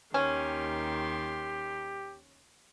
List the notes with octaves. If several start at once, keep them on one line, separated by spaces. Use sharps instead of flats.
D#2 D#3 C#4 G4 C6